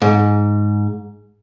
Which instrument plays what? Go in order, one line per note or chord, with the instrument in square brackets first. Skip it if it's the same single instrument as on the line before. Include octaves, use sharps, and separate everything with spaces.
[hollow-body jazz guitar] G#2